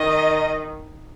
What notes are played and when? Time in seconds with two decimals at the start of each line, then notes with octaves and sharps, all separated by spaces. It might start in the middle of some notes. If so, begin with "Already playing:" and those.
Already playing: D#3 D#5